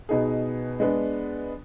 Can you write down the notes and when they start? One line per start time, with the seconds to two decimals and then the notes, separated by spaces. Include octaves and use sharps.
0.09 B2 B3 D#4 G#4
0.80 G#3 B3 D4